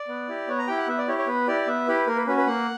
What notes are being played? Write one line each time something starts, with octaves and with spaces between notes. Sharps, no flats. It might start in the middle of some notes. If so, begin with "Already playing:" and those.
Already playing: D5
B3
E4 G4
B3 C#5
A#5
E4 G4 G5
F#5
B3 E5
D5
E4 G4 C#5
C#5
B3 B4
E4 G4 D5
B3 E5
E4 G4 B4
A#3 A#4
B4
C#4 F#4 B4
B4
A#3 F#5